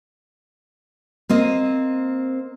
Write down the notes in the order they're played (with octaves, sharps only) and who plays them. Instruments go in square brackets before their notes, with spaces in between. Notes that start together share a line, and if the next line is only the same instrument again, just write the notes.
[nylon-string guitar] A#3 C4 D#5